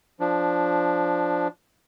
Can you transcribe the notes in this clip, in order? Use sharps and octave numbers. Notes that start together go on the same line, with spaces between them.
F3 D4